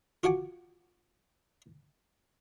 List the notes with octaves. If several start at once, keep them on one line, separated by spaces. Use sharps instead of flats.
F4 F#4 F#5 G#5 D6